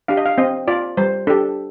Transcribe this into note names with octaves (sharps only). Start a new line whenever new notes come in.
D4 G4 F5
D#5
F5
C4 D#5
F4 D5
G3 C5
D4 G4 A4